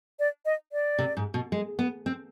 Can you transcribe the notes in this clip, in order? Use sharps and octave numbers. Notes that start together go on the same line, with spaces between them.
D5
D#5
D5
C3
G#2
B2
G#3
B3
C4